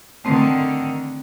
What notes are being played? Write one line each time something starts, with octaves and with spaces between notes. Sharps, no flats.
D3 D#3 A3 C4